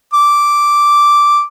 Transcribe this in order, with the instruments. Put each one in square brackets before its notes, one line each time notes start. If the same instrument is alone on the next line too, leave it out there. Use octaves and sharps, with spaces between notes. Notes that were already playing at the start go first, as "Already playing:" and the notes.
[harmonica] D6